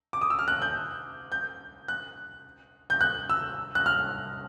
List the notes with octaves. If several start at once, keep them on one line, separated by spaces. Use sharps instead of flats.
D6
D#6
E6
F6
F#6
G6
G6
F#6
G6
F#6
E6
F#6
F6